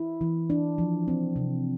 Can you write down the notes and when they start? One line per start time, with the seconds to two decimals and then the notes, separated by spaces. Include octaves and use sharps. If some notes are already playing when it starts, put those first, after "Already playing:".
Already playing: E4
0.21 E3
0.50 D4
0.78 F3
1.08 C4
1.36 C3